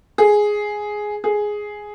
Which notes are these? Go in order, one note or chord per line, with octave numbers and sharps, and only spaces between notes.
G#4
G#4